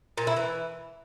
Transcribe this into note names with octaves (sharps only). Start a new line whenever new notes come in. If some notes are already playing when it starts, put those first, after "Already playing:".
A#2
E4
E3